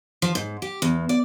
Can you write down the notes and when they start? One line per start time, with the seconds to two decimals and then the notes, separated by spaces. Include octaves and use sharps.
0.22 F3
0.35 G#2
0.62 G4
0.82 E2
1.09 D5